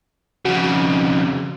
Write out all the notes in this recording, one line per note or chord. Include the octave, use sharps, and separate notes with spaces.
F2 C#3 F#4